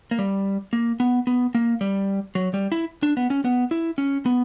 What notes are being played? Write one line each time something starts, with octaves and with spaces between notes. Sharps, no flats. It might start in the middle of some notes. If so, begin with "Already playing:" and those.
A#3
G3
A#3
B3
B3
A#3
G3
F#3
G3
E4
D4
B3
C#4
B3
E4
C#4
B3